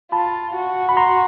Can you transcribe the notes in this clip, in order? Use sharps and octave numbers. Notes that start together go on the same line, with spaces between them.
F4 A5 B5
F#4
B5
A#5 C6